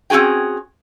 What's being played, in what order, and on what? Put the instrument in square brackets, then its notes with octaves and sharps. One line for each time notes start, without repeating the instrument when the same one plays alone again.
[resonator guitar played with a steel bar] C4 C#4 F#4 G#4 G5